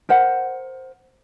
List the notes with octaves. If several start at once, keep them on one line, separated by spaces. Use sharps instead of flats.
A#4 C5 F#5